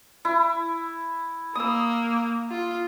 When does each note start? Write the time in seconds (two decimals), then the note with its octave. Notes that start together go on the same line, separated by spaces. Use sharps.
0.25 E4
1.55 A#3 D#6 E6
2.50 F4